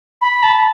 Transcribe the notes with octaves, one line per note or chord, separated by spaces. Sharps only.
B5
A5